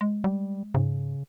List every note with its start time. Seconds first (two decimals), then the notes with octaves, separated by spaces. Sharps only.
0.01 G#3
0.24 G3
0.74 G#2 C#3